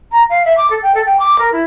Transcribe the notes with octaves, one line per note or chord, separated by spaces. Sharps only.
A#5
F5
E5
D6
A4
G5
A4
G5
D6
A#4
E4